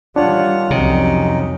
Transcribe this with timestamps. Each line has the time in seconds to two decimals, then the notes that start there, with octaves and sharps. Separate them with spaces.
0.16 D#3 E3 G3 D4 F4 C#5 F#5
0.71 C2 F2 C3 F#3 C#4 D#4